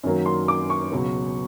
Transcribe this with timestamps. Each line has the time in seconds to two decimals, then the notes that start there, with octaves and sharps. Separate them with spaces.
0.03 F#2 D#3 F#3 A#3
0.26 C6
0.48 D6
0.70 C#6
0.92 C#2 B2 F#3